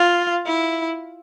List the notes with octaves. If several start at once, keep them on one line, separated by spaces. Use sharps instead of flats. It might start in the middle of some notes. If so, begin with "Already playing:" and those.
Already playing: F4
E4